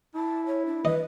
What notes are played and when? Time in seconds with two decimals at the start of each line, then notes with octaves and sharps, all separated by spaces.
0.15 E4 A5
0.46 C#5
0.66 D4
0.85 B4 D#5